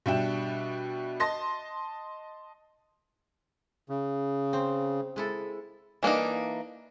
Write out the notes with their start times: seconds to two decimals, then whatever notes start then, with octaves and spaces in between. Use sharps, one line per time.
0.06 B2 G3 D4 E5 G5 E7
1.20 D#5 A5 C6 A#6
3.89 C#3
4.53 C4
5.16 G#3 E4 A4
6.03 E3 A#3 D4 D#4